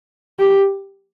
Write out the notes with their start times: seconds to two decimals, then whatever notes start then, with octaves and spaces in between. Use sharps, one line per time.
0.39 G4